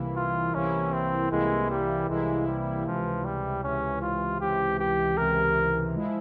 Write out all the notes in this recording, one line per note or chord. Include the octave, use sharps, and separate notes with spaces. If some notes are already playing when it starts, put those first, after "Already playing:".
Already playing: C2 C3 E3 A#3 E4
F4
C2 C3 E3 A#3 C#4 E4
C4
C2 C3 E3 G#3 A#3 E4
G3
C2 C3 E3 G#3 A#3 E4
G3
C#2 C3 E3 F3
G3
C#2 C3 E3 C#4
F4
C#2 C3 E3 G4
G4
C#2 C3 E3 A#4
F3 G#3 E4